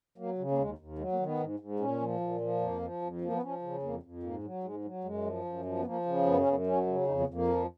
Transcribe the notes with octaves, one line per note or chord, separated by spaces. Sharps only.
F#3 A#3
C#3
A#3
D#2 G#3
D#2
F#3 G#3
A#3
D#3
B3
G#2
G#2
A#2 C#4
F3
A#2
F3
F2 A#3
F3
F2
F3 A#3
B3
F3 C#4
C#3
F2 A#3
F2
G#2 A#3
F#3
G#2 G#3
F#3
F#2 G#3
F3
F#2
F3
B3
F3 A#3
C#3
F#2 B3
C#4
F#2 B3
F#3 C#4
C#3
F2 D#4
B3
F2
A#3
F3